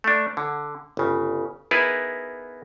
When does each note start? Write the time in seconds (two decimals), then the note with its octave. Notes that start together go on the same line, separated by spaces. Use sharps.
0.04 A3 D4
0.37 D3
0.97 G1 C#3
1.71 B3 D#4 E4 G#4 A#4 B4